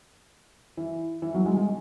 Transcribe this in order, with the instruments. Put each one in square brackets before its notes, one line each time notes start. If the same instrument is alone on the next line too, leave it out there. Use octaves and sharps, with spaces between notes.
[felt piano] E3
E3
F#3
G#3
G#3